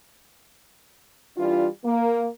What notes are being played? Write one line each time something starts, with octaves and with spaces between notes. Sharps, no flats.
E3 G3 D4 F4
A#3